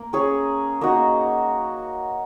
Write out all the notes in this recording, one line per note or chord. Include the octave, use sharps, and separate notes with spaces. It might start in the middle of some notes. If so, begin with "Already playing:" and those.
Already playing: A#3 A#4
C#4 G#4 C#5
A#3 D#4 F#4